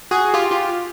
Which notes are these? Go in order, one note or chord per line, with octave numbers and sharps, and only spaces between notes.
F#4 G#4
F4 G4
F4 G4